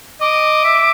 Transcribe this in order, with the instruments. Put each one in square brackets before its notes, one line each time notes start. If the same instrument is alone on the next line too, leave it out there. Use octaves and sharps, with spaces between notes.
[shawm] D#5 [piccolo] D6
[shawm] E5